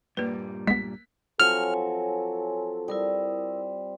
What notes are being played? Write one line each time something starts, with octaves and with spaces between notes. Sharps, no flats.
G2 A#2 G3 A#3 B4
G#3 B3 B6
F3 F#3 C4 A4 C#5 G#5 F6
G3 E4 A#4 D#6